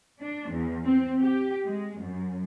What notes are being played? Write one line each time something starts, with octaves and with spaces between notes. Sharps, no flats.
D4
E2
C4
G4
G#3
F#2